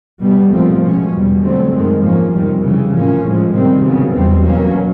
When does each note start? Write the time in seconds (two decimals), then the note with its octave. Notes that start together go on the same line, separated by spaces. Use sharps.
0.22 B2 G3 B3
0.51 A#2 F3 A3 C4
0.81 B2 G#3 C#4
1.12 E2 B2 G3
1.42 D3 F#3 A3 C4
1.72 F#2 D#3 G#3
2.02 G#2 F3 A#3 C#4
2.33 F2 C3 D#3 G3
2.63 C#3 E3 G3
2.93 A2 F3 A#3 C#4
3.23 A2 F3 G#3
3.54 C3 D#3 G3 C4
3.84 C#3 F#3 B3
4.14 E2 B2 G3 C4
4.43 B2 F#3 A#3 C#4